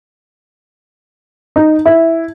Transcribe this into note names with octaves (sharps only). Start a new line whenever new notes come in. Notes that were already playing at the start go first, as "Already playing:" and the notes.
D#4
E4